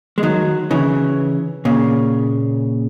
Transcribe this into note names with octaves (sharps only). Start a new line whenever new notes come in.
G#3
D#3 F#3
C#3 E3
A#2 C#3